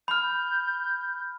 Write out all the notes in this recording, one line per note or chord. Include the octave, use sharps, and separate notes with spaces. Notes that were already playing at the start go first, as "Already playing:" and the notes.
B5 F6 G6